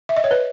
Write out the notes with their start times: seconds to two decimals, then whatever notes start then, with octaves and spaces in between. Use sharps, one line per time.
0.09 E5
0.17 D#5
0.24 C#5
0.31 B4